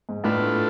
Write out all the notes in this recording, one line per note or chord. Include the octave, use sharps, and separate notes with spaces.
G#2
A2 A3 D4 F4 B4